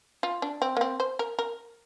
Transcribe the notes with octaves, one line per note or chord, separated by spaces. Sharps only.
F4
D4
C4
A#3
C4
C5
A#4
A#4